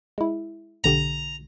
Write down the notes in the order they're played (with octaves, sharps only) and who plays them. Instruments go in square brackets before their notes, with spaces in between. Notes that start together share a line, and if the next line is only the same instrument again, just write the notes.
[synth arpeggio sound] G#3 E4
[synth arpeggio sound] B1 D3 G4 [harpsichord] A#5